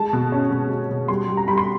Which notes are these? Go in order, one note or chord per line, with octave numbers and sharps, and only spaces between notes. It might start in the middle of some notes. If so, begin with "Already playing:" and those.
Already playing: G#3 A5
B2
C#4
B2
B2
B2
G3 C6
G3
A#5
G3 B5
C6